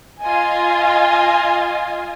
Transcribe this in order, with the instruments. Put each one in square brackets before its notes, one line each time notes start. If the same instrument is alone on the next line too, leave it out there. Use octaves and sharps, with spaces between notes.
[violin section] F4 D#5 G#5